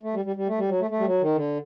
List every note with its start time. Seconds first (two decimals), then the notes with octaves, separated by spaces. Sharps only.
0.03 A3
0.14 G3
0.25 G3
0.36 G3
0.48 A3
0.58 G3
0.69 F#3
0.80 A3
0.91 A3
0.99 G3
1.06 F#3
1.21 D#3
1.35 D3